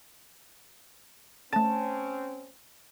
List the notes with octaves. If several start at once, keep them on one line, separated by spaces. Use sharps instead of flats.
A3 C4 C#4 A5 A6